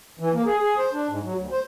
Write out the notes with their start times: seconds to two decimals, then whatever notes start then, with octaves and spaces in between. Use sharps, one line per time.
0.19 E3
0.33 A#3
0.45 G#4
0.60 G#4
0.78 C5
0.93 D4
1.08 G#2
1.23 F#3
1.35 D2
1.52 C5